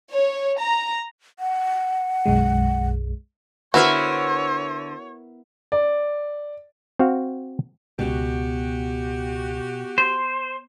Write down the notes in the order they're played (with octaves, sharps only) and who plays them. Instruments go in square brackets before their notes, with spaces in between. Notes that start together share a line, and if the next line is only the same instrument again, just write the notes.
[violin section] C#5
A#5
[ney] F#5
[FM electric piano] B1 F#2 G#3
[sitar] D3 C5 E5 [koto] B3 E4 A#4 [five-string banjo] F#4 [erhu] C#5
[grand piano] D5
[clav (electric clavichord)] C4 F#4 F5
[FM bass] C#2 [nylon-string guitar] B2 [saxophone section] F#4 G4
[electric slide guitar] C5